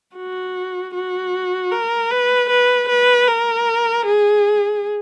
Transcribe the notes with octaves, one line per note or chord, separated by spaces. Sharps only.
F#4
F#4
A#4
B4
B4
B4
A#4
G#4